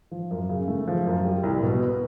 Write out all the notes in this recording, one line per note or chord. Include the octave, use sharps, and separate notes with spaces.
F3
F#2
C#3
A3
F3
F#2
G3
C2
B2
B3